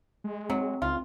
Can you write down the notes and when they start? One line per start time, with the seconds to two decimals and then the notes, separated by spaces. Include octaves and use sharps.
0.24 G#3
0.50 F#3 C4
0.82 C#2 F4